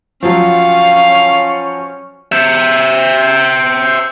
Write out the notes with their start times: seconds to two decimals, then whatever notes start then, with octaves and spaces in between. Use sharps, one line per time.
0.23 F3 F#3 C#4 F5
2.32 C5 E5